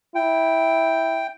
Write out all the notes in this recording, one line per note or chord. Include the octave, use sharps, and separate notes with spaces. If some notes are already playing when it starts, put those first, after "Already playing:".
E4 G5